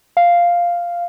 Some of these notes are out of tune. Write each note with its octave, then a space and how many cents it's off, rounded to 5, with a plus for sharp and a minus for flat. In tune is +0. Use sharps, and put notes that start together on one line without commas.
F5 -5